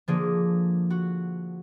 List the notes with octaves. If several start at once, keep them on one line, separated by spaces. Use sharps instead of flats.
D3 F3 A#3 G#4
F#4